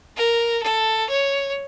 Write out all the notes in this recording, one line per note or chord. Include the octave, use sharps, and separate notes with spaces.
A#4
A4
C#5